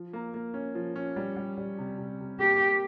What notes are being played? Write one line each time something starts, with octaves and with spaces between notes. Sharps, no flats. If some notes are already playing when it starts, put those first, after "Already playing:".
Already playing: F3
A#3
A#3
C#4
F3
C#4
G3
G3
G3
C3
C3
C3
A#3 G4
A#3